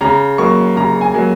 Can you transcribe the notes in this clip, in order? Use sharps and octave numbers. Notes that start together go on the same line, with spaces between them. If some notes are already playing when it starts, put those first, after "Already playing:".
C#3 A#5
F#3 A#3 C#6
C#3 A#5
G#5
F#3 A#3